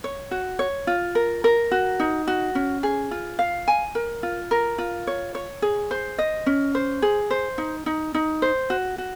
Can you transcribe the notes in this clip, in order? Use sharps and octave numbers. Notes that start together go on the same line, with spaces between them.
C#5
F#4
C#5
F4
A#4
A#4
F#4
D#4
F#4
C#4
G#4
F4
F5
G#5
A#4
F4
A#4
F4
C#5
C#5
G#4
C5
D#5
C#4
C5
G#4
C5
D#4
D#4
D#4
C5
F#4
F#4